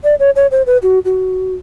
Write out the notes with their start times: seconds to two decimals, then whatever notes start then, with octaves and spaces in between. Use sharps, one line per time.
0.04 D5
0.20 C#5
0.36 C#5
0.51 C5
0.66 B4
0.83 F#4
1.05 F#4